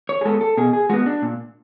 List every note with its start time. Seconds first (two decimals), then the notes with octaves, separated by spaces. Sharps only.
0.09 C#5
0.21 G#4
0.25 G#3 B3 A4
0.41 A4
0.57 B2 G#4
0.73 G#4
0.90 G#3 B3 F#4
1.06 D4
1.22 A#2